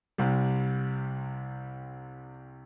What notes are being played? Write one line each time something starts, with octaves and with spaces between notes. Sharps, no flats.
C2 C3 G3